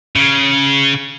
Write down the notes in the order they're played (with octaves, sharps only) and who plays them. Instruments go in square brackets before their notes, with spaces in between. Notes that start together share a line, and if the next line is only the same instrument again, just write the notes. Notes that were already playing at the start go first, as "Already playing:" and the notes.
[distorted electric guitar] C#3